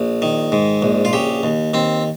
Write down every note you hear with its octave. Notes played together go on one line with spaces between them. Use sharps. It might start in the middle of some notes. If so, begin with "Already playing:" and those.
Already playing: A#1
D#3
G#2
A#1
F4
C#3 G4
D#2
D#2 C4